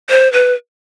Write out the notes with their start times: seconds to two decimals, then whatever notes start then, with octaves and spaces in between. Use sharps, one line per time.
0.10 C5
0.33 B4